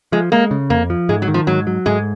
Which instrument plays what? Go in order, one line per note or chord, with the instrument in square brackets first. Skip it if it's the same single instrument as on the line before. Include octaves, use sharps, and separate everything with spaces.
[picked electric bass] F3 [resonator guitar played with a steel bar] G#3
[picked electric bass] G#3 [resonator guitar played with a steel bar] A#3
[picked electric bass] C#3
[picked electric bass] F2 [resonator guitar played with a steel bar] A#3
[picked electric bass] F3
[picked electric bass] G#2 [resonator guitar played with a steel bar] G#3
[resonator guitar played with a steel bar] F#3
[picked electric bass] D#3
[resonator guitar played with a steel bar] F3
[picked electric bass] G#2 [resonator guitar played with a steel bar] F#3
[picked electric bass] F#3
[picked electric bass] G#2 [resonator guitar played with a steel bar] G#3